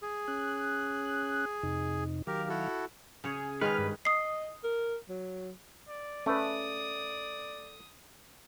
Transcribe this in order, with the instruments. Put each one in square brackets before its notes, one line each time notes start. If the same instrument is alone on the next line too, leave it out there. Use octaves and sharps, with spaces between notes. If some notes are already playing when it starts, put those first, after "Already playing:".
[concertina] G#4
[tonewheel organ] C#4 F#6
F2 C3 D#4
[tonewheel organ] D#3 F#3 F5 [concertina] G4 A#4
[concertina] E4 F#4 A4
[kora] C#3 C#5 [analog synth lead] G#4
[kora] D#3 C#4 G#4 [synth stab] G#3 [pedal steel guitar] B4 [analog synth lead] F6
[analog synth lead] G2
[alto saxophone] D#5 [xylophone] D#6 C7
[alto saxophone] A#4
F#3
[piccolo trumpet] D5
[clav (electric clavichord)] A3 [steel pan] C#4 B4 [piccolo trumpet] D5 [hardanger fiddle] D#6